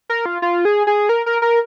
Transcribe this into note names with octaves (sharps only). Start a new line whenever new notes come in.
A#4
F4
F4
G#4
G#4
A#4
A#4
A#4